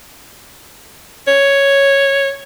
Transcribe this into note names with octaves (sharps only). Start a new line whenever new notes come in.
C#5